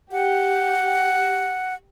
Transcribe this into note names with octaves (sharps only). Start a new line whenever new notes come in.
G4 F#5